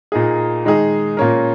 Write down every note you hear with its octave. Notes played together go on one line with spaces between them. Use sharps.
A#2 A#3 D#4 G#4
D#3 G#3 D#4 G#4
A#2 A#3 C#4 A#4